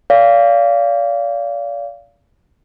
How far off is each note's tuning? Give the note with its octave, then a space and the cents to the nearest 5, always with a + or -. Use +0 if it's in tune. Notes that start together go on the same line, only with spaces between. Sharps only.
D5 -40 F5 -10